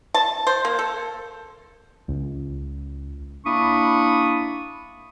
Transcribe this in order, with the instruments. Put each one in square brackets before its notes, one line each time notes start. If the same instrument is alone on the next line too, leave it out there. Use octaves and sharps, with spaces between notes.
[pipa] A5
C5
A#3
A4
[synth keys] C#2
[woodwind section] A#3 D4 E4 B5 C#6 D#6